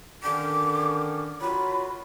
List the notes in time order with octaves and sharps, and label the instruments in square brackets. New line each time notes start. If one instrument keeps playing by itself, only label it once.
[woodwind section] D3 D#3 C#4 [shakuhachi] D6
[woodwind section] F#3 F4 F#4 [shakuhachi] B5